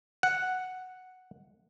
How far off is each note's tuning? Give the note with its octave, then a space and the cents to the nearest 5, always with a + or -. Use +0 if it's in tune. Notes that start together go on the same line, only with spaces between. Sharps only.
F#5 +0